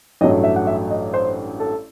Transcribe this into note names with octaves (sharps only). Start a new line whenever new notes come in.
A1 G2 F#3 A3 D#5
E5
F#5
E5
D#5
C5
A4